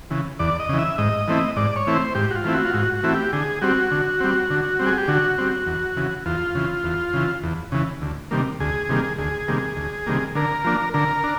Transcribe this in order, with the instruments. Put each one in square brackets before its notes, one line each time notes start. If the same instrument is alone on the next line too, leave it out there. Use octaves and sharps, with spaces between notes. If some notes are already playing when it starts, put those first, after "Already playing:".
[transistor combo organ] C#3 E3
E2 D5
D#5
C#3 E3
E5
G#2 D#5
E3 A3 C4 E4
G#2 D5
C#5
E3 A3 C4 E4
C5
G#2 G4
F#4
F4
E3 A3 C4 E4
F#4
F4
G#2 F#4
F#4
E3 A3 C4 E4
G4
D3 G#4
G3 C4 F#4
D3
G3 C4
D3
G3 C4
G#4
G4
D3 F#4
G3 C4
E2
C#3 E3
E2 F4
C#3 E3
E2
C#3 E3
E2
C#3 E3
D2
C3 D#3 G3 A#3
D2 G#4
C3 D#3 G3 A#3
D2 G#4
C3 D#3 G3 A#3
D2
C3 D#3 G3 A#3
D3 A#4
F3 A#3 D4
D3 A#4
D4